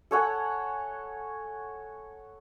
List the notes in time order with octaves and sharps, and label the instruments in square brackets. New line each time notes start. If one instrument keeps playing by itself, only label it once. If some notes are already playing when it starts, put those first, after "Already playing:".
[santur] A4 C#5 F#5 G#5